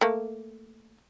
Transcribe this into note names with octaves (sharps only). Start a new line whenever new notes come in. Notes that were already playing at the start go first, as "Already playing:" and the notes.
A3 A#3